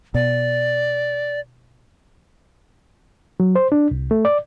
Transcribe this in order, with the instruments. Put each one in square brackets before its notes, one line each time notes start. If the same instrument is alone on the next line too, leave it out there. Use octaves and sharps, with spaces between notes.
[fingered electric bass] B2 [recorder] D5
[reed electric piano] F#3
C5
D4
C2
A3
D5